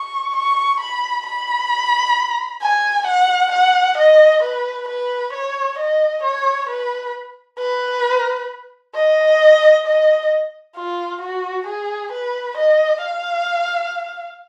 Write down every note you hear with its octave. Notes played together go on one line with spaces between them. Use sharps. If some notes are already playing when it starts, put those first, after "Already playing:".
Already playing: C#6
C#6
B5
B5
G#5
F#5
F#5
D#5
B4
B4
C#5
D#5
C#5
B4
B4
D#5
D#5
F4
F#4
G#4
B4
D#5
F5